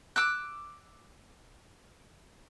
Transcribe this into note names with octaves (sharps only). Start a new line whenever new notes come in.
D6 E6 F#6